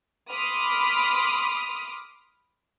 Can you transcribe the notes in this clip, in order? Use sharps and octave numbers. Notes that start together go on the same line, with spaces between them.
B5 C6 D6 D#6 F6